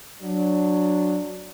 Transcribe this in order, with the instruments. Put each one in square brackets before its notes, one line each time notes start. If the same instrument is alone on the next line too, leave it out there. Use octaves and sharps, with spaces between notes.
[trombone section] F#3 D4